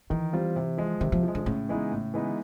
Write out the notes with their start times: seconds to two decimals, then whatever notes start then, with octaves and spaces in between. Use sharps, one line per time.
0.10 D#3 E3
0.33 G3 C4 F4
0.56 C3
0.78 F3 G#3
1.00 C3 D#3
1.12 F3
1.23 F3 G#3
1.35 D3
1.46 A2 C#3
1.69 E3 G#3 B3 D#4
1.92 A2
2.14 E3 G#3 B3 D#4